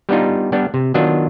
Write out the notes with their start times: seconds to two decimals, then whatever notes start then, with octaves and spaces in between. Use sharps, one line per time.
0.09 G3 B3 D4 D#4 F4
0.52 G3 B3 D4
0.74 C3
0.94 D#3 F#3 B3 D4 F4